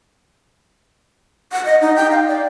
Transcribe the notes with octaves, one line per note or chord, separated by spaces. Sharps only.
F#5
D#5
D#4
G5
F5
D5